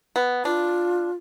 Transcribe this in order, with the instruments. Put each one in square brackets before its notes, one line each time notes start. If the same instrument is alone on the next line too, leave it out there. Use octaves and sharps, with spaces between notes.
[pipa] B3
[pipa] D4 [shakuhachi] F4